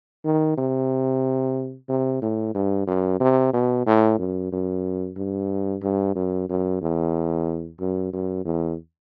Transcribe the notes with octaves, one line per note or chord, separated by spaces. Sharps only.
D#3
C3
C3
A2
G2
F#2
C3
B2
A2
F#2
F#2
G2
G2
F#2
F#2
E2
F#2
F#2
E2